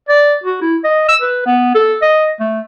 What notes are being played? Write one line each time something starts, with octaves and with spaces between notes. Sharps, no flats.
D5
F#4
E4
D#5
E6
B4
B3
A4
D#5
A3